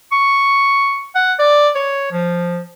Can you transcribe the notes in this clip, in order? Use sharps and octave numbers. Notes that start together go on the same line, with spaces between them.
C#6
F#5
D5
C#5
F3